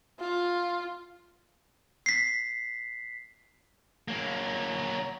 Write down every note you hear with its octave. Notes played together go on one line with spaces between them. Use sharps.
F4
B6 C7
F#3 A#3